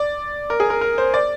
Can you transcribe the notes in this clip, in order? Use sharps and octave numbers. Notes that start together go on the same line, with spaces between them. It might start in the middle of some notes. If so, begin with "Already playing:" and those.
Already playing: D5
A#4
G#4
A#4
A#4
C5
D5